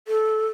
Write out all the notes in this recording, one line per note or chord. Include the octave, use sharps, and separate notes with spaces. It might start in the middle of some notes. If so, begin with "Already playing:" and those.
A4